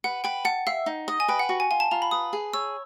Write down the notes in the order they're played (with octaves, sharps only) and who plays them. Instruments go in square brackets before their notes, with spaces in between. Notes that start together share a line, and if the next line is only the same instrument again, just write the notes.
[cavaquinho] B4 [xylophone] F#5
[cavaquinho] B4 [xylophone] G5
[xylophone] F#5 [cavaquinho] A5
[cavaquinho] E5 [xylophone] F5
[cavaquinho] D#4
D#5
[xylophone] G#5
[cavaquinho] B4 [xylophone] G5
[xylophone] F#5
[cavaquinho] F#4
[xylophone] G#5
[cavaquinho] F4 [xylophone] G#5
[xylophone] A5
[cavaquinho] F4 [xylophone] A#5
[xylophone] B5
[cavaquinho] B4 [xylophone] D#6
[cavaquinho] G#4
[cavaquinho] C#5 [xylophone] E6